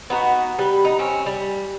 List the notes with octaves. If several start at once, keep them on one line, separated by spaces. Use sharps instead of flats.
B3 D#4 F#4
G3 B4
D#4
C4 C#4
G3